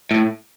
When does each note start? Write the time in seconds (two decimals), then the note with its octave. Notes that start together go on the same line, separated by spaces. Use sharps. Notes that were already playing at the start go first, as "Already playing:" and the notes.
0.11 A2